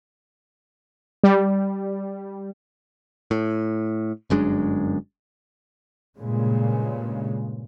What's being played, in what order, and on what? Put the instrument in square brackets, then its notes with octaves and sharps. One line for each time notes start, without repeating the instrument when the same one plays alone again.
[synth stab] G3
[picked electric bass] A2
G1 F#2 G#3 D4
[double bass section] G2 A#2 C#3 G#3